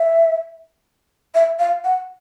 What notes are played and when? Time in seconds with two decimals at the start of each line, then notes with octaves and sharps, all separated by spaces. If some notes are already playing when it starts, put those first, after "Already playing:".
Already playing: E5
1.35 E5
1.59 F5
1.84 F#5